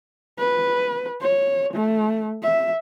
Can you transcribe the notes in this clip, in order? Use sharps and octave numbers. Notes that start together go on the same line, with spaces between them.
B4
C#5
A3
E5